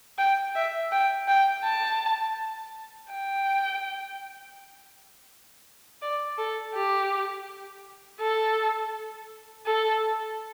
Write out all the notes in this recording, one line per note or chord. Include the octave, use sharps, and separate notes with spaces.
G5
E5
G5
G5
A5
G5
D5
A4
G4
A4
A4